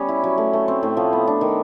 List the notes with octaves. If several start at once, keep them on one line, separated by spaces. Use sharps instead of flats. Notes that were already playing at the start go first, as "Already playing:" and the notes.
Already playing: G3 B3 C#4
E4
F#3
A3
A3
C4
A2
F3
B3
D4
D#3